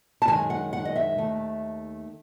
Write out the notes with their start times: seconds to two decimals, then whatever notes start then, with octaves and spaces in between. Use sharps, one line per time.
0.22 A5
0.28 F#2 D#3 G#3 G#5
0.50 F#5
0.73 F#5
0.85 D#5
0.96 E5
1.18 D#2 D#3 A3